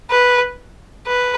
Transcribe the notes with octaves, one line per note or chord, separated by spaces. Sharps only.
B4
B4